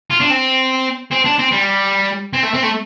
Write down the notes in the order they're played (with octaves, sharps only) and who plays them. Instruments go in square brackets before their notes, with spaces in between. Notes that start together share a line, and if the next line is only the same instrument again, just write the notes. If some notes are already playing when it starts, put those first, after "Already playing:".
[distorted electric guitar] F4
D4
C4
C4
D4
C4
G3
C4
A3
C4
A3